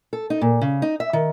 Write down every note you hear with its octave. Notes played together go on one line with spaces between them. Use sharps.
A4
D#4
A#2
C#3
D#4
E5
D#3